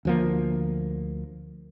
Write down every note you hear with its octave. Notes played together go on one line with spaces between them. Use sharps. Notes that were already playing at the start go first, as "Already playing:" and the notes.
D2 F3 A#3